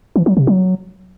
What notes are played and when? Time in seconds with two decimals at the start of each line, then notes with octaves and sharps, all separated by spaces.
0.16 E3
0.26 F#3
0.37 C3
0.47 F#3